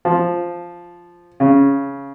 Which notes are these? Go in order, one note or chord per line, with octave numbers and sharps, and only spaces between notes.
F3
C#3